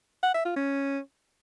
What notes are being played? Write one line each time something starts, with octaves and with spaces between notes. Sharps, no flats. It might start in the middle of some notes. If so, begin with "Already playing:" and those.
F#5
E5
F4
C#4